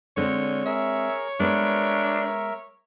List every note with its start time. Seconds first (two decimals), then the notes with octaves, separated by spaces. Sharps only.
0.17 D3 G#3 C4 D4 C#5
0.66 G#4 A#4 E5
1.40 G#3 B3 D4 A#4 B4 E5